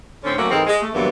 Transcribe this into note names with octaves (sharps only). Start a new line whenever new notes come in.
A2 D3 C4 C#4
F#3 A3 A#3 C#4 F#4
G#2 E3 G#3 C4 A4 A#4
G#3
A3
G2 D3 E3 F#3 A#3 B3